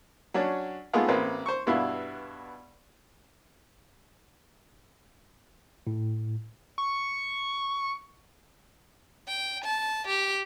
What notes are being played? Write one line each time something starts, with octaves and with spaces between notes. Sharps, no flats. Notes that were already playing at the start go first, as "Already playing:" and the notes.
F#3 C#4 D4
G#3 A3 B3 D#4 F4 G#4
A1 A#3 C4 B4
C5 C#6
G2 B2 B3 E4 F5
A2
C#6
G5
A5
G4